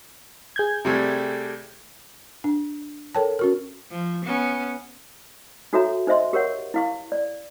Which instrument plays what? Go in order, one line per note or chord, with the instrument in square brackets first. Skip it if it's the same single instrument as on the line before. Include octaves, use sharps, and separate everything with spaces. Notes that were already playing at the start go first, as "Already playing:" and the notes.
[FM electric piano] G#4 G6 G#6
[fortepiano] C3 G3 A3
[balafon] D4
A4 A#4 C#5 G5 A5
C#4 F#4 A#4
[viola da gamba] F3
B3 C#4
[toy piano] D#4 F#4 A4 C#5 E5 A#5
D#4 C5 D#5 E5 C6
G4 A#4 C#5 F#5
E4 F5 C#6
D5